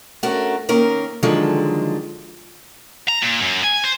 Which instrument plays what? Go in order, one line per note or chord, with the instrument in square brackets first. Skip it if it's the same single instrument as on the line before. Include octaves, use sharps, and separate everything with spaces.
[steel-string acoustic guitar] A3 C#4 D4 F#4 A#4
D#3 A#3 C#4 A#4
D3 D#3 F3 F#3 G#3 A4
[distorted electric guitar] A#5
A#2
F#2
G#5
C5